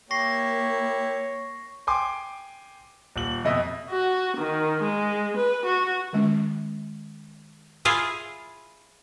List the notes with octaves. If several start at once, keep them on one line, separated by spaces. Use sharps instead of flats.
A#3 E4 G4 C#5 C#6 A#6 C7
G5 G#5 C6 D6
D#1 F#7
F2 B2 D#5 E5
F#4
D#3
G#3
B4
F#4
D#3 G#3 C#4
E4 F4 G#4